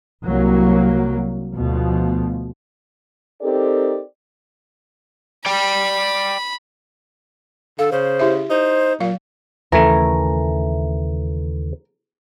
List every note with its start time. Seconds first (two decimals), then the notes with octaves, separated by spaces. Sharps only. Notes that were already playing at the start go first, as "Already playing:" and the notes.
0.24 C2 F#3 A#3
1.55 D2 B2 F3
3.42 C4 D#4 G4 A4 A#4 D5
5.46 D5 G5 B5
7.79 D3 A4 F5
7.92 C#3 C5
8.19 E4 G4 E5
8.50 D#4 C5
9.00 A#2 F#3 F5
9.72 D#2 C#3 E3 A3 A#4